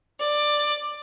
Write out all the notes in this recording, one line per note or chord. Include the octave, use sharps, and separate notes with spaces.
D5